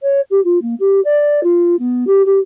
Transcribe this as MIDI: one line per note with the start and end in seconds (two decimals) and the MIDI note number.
0.02 0.21 73
0.31 0.40 67
0.44 0.61 65
0.62 0.75 58
0.80 1.00 67
1.05 1.43 74
1.43 1.76 65
1.79 2.05 59
2.07 2.22 67
2.26 2.39 67